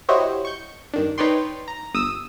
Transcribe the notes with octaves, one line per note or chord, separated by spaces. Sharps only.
E4 F#4 G4 C5 C#5 D#5
C#6 G6
G2 D#3 D4
D#4 B4 C#5 D5 G5 C6
A#5
G1 D#6 E6